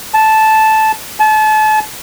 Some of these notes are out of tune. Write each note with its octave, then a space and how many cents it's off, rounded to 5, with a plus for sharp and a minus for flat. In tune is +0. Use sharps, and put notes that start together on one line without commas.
A5 -10
A5 -35